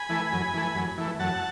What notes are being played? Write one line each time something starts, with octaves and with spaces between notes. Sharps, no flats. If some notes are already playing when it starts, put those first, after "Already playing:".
Already playing: G#5 B5
E3 A3
F#2
E3 A3
F#2
E3 A3
F#2 F#5 A5